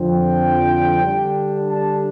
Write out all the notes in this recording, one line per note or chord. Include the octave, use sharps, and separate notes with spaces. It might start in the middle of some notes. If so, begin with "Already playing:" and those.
Already playing: F2 D3 F3 C4
G5
D3 G3 D4
A5